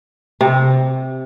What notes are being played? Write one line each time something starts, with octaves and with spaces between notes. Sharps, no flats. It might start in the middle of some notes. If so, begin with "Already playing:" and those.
C3